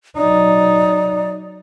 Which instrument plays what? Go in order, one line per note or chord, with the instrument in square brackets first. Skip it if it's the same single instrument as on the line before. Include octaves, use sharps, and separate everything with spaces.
[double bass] F#3 D#4 [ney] D5